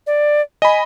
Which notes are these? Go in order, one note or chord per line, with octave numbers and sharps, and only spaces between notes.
D5
D#5 G#5 B5